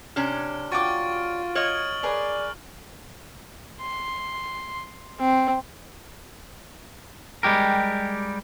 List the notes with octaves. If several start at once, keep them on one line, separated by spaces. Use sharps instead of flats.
C3 C#4 D4 F6
F4 F#4 G5 C#6 D6 A6 D7
C#5 D#5 F6 F#7
G#4 A#4 B4 D5
C6
C4
G3 G#3 G4 A#4